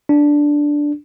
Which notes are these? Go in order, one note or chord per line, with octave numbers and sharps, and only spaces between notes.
D4